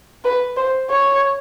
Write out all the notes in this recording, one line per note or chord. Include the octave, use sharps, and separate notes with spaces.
B4
C5
C#5